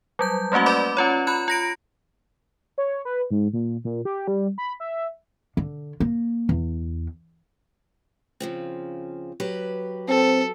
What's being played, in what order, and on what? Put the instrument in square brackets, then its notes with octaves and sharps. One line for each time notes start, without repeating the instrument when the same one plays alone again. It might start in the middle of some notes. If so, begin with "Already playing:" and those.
[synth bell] F#3 G3 G6
G3 A3 A#3 C#4 F#4
B4 D5 B5 D6
C#4 F4 C#5
F4 B5 F#6
F4 A#6 D7
[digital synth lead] C#5
B4
G#2
A#2
A#2
G4
G3
B5
E5
[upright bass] D3
A#3
E2
[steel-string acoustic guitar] C#3 F3 C4
F#3 G4 B4
[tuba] C4 [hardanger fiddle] A4